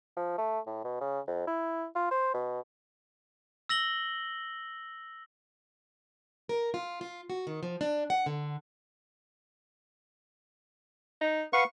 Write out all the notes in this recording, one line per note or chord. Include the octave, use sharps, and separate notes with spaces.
F3
A3
A2
B2
C#3
F2
E4
F4
C5
B2
E6 A#6 F#7 G7
A#4
F4
F4
F#4
D#3
F3
D4
F#5
D3
D#4
B4 F5 F#5 C#6